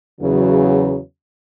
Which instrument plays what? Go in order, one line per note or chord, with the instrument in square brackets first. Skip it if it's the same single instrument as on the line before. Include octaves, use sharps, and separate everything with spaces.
[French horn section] E2 C#3 F#3